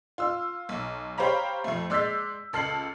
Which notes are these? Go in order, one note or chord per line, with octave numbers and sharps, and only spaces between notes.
F4 E6 F6
B1
G4 C5 C#5 F5 A#5 B5
F2 A3
G#3 D5 E6 G6 A6 B6
C#2 A4 F6 C7 F#7